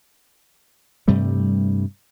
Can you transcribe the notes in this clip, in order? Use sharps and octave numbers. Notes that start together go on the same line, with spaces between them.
G2 C3 G3 A3